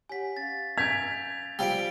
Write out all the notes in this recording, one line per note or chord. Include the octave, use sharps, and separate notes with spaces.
G4 C#5 F#5 G#5 B6
C#4 F5 A6
G#5 G6 G#6 B6 F7
F3 G3 D7 G7